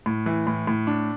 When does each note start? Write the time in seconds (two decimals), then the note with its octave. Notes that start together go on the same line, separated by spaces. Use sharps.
0.06 A2
0.26 E3
0.47 A2
0.67 A2
0.87 D4